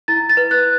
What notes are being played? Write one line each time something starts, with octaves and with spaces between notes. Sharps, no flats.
E4 A6
A6
B4
F#6